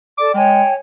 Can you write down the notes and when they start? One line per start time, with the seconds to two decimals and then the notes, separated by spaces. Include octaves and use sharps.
0.18 A4 D5 D6
0.34 G#3 C#5 G5 G#5